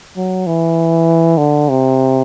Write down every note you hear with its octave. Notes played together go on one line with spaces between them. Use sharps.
F#3
E3
D3
C3